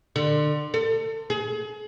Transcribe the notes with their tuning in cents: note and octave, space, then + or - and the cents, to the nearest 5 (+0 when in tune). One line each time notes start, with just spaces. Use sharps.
D3 +30
A4 +30
G#4 +35